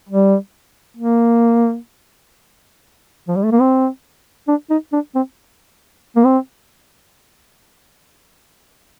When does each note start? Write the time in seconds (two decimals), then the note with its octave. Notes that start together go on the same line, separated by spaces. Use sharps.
0.09 G3
0.97 A#3
3.28 F3
3.36 G3
3.44 A3
3.52 A#3
3.61 C4
4.48 D4
4.70 D#4
4.93 D4
5.15 C4
6.16 A#3
6.24 C4